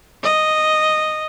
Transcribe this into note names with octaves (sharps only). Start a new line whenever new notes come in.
D#5